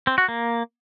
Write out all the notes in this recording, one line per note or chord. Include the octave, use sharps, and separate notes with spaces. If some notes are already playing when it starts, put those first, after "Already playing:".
C4
F#4
A#3